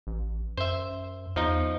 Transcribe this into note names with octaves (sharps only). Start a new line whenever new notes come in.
A1
F#2 C5 E5
E2 F3 D#4